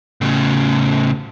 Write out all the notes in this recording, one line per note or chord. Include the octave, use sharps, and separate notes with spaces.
A2 C#3